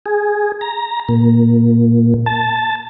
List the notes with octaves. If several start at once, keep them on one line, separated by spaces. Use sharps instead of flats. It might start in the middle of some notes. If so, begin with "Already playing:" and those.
G#4
A#5
A#2
A5